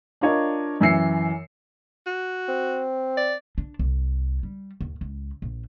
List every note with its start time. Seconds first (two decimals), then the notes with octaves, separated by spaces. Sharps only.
0.21 D4 F4 A#4 C#5 D#5
0.80 F#2 E3 E5 E6 C7 C#7
2.07 F#4
2.49 C4
3.17 D5
3.58 D4
3.79 C2
4.43 G3
4.81 D#2
5.01 C#2
5.42 A#1